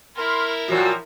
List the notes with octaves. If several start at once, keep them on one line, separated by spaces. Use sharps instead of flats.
E4 A#4 B5 C6 F6
A#2 F3 F#3 F#4 G4 E6